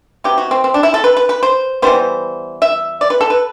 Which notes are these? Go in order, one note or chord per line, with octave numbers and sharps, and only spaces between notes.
C3 F#3 B3 G4
F#4
C4
C4
D4
E4
A4
B4
B4
B4
C5
E3 G3 B3 C5
E5
D5
B4
A4
B4